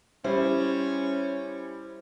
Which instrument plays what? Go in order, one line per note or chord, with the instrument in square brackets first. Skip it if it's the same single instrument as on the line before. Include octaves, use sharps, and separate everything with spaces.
[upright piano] G3 E4 [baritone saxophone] C#4 [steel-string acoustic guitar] C5